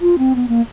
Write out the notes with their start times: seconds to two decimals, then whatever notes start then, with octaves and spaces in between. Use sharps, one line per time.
0.01 F4
0.19 C4
0.36 B3
0.48 A#3